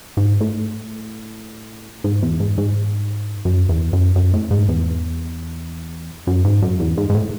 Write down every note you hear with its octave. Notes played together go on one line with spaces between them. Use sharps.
G#2
A2
G#2
E2
G#2
G#2
F#2
E2
F#2
F#2
A2
G#2
E2
F#2
G#2
F#2
E2
G#2
G#2
A2